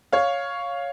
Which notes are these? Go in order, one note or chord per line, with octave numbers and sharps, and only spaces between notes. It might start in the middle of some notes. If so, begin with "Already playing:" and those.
C#5 F5